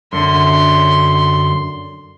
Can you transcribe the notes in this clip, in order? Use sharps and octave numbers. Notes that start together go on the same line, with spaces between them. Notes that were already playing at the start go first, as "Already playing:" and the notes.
F#2 D3 C6